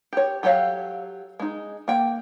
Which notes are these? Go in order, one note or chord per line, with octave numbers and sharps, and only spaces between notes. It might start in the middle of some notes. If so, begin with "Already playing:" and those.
G4 C#5
F#3 G4 A4 C#5 F5
G#3 D#4
A#3 G5